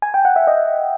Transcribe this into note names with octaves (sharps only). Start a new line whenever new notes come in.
G#5
G5
F#5
E5
D#5